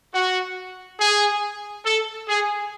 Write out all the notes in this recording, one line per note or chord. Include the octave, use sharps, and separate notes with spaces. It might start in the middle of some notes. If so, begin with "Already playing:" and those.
F#4
G#4
A4
G#4